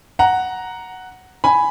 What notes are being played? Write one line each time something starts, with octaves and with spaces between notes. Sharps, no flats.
F#5 A#5
G#5 B5